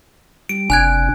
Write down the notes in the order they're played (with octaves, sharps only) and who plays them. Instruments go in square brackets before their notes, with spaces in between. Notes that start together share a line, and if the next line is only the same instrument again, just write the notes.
[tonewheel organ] G3 [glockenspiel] D7
[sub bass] F#1 [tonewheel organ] C3 D4 [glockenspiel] G#5 F#6 G#6